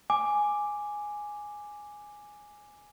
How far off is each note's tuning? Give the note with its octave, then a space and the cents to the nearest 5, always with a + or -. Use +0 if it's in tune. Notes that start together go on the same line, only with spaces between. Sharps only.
G#5 +0 D6 +0